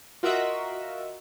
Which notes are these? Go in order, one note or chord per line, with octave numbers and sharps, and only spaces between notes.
F4 F#4 A#4 D#5 E5 F#5